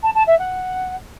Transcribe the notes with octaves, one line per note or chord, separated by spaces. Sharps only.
A5
A5
E5
F#5